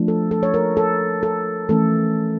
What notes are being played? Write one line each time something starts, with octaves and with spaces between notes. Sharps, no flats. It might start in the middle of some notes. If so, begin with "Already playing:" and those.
Already playing: F3 A3 D4
A4
A4
C#5
A#4
A4
A4
E3 A3 C#4 A4